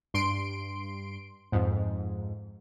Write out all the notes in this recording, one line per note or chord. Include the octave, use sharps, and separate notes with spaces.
G2 C6 D7
F2 G#2